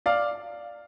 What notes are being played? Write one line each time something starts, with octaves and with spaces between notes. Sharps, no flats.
D5 F5